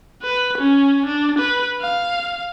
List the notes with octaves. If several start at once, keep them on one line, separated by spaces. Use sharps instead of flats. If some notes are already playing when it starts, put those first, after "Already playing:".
B4
C#4
D4
B4
F5